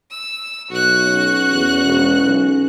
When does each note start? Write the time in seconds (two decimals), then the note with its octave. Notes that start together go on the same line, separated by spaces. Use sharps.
0.11 E6
0.70 B1 F#4 F#6
1.05 C#4
1.52 E2
1.84 E1
2.23 B1